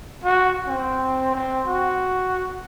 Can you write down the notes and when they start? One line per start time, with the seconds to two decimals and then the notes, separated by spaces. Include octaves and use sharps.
0.24 F#4
0.67 C4
1.35 C4
1.67 F#4